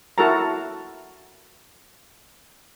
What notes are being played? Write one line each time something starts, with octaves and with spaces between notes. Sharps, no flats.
E4 F#4 A4 A#4 A5 A#5